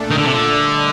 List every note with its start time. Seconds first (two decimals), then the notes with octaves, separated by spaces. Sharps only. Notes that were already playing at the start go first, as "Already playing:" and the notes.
Already playing: A#2 A3 D4 A4
0.11 D#3
0.18 D3
0.24 C3
0.32 D3
0.46 G3 D4 A4 D#5